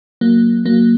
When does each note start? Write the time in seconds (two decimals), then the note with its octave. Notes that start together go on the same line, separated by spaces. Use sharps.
0.21 F#3 A#3
0.66 F#3 A#3